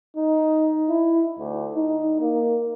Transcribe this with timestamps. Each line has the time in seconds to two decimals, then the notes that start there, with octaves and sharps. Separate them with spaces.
0.16 D#4
0.89 E4
1.39 D2
1.75 D#4
2.21 A#3